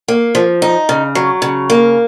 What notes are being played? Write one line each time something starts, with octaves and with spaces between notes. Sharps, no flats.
A#3
F3
D#4
C#3
F#3
C#3
A#3